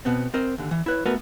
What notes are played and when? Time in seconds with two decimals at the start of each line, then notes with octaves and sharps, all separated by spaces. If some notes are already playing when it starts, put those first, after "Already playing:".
0.05 B2 B3 C4
0.34 C4 A#4 C5 D#5
0.58 D#2 D3
0.71 E3
0.86 E4 B4 C#5
1.06 A3 B3 F#4 A#4 B4